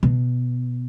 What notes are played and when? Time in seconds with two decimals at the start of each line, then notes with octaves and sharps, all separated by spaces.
0.03 B2